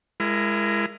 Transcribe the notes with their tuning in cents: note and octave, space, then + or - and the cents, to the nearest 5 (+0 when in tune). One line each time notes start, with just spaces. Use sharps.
G#3 +0 E4 +35 A#4 +0